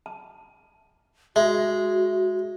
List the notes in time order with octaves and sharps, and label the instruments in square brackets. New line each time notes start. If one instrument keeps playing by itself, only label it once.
[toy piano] A5
[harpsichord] G#3 [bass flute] F#4 [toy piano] E5